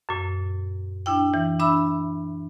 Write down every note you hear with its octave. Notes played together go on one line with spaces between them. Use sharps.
F#2 A#2
D4 E4 G5
E3
D4 E5 B5 E6